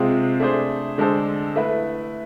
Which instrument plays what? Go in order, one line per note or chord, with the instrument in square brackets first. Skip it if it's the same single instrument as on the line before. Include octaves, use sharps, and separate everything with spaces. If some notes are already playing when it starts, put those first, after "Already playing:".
Already playing: [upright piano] C3 G#3 C4 F4 G#4
A3 D4 G#4 C5
D3 G#3 D4 A4 C5
A3 E4 B4